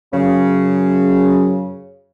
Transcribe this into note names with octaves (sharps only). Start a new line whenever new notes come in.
F#2 C#3